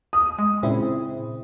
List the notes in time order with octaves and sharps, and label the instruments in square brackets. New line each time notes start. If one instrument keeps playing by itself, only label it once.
[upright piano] D#6
[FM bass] G#3
[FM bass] A#2 [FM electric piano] C#3 C4 E4